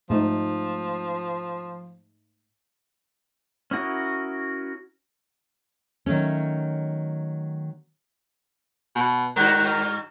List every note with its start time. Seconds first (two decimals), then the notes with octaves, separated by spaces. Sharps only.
0.10 G#2 F3 A3 D#4
3.71 C#4 E4 F#4 A#4 D#5
6.06 D#3 F#3 A3 C#4
8.96 B2
9.36 G2 D#3 F#4 F#6
9.67 F6